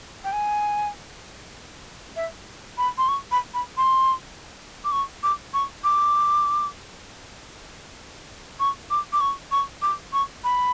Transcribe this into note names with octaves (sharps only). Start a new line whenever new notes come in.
G5
G#5
E5
B5
C6
C#6
B5
B5
C6
D6
C#6
D6
C#6
D6
C#6
D6
D6
C#6
C#6
D6
C#6
B5